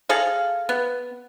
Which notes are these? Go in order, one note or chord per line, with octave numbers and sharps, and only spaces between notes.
G#4 A4 D#5 F5
B3